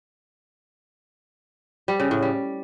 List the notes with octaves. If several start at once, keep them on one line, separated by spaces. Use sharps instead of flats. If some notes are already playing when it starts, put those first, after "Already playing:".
G3
C#3
A2
G3